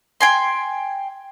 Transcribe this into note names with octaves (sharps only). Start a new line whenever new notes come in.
G5 G#5 C6